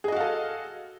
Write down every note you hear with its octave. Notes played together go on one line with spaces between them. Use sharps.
F#4 G#4 A4 D#5 F5